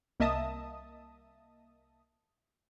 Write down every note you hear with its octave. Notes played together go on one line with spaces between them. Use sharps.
C2 A#3 D#5 E5 A5 D#6